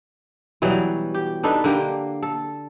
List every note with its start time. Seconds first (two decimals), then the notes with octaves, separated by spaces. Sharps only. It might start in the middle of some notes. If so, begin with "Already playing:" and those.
0.62 B2 E3 F#3 G3
1.14 G4
1.43 D4 D#4 A4 B4
1.64 D3 A#3 G4
2.23 A4